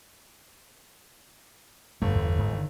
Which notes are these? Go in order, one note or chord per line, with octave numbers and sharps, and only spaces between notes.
G1 G2 A3
E2
G#2
D3 D#3